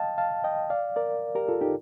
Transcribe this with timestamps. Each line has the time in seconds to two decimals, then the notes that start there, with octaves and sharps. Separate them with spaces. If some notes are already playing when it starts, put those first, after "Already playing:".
Already playing: D#5 F5 G5 A5
0.18 F5 A5
0.44 D#5 G5
0.70 D5 F5
0.96 A#4 D5
1.35 G4 A#4
1.48 F4 A4
1.61 D#4 G4